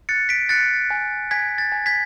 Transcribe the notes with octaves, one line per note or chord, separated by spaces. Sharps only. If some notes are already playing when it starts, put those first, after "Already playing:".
F#6 A6 C#7
B6 D7
F#6 A6 C#7
G#5
G#5 G#6 B6
A6
G#5
G#6 B6